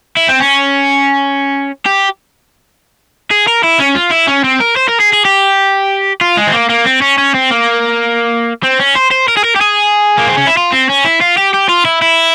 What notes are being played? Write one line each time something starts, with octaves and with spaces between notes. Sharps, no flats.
E4
C4
C#4
G4
G#4
A#4
E4
C#4
F4
E4
C#4
C4
A#4
C5
A#4
G#4
G#4
G4
F4
G#3
C4
A#3
A#3
C4
C#4
C#4
C4
A#3
C4
C#4
C5
C5
A#4
G#4
A#4
G4
G#4
A#3
C4
C#4
E4
F4
C4
C#4
E4
F4
G4
G4
F4
E4
E4